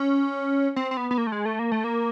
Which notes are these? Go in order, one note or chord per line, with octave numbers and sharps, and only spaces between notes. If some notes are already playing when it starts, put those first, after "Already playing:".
Already playing: C#4
C4
C4
B3
B3
A#3
A3
G#3
A3
A#3
A3
A#3